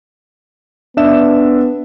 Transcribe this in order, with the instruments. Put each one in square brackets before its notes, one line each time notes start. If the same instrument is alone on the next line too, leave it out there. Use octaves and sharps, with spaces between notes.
[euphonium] B3 [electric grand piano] D4 E5 E7